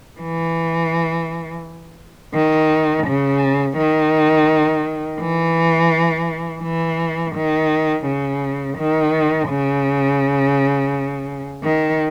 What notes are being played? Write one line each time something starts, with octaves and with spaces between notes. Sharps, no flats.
E3
D#3
C#3
D#3
E3
E3
D#3
C#3
D#3
C#3
D#3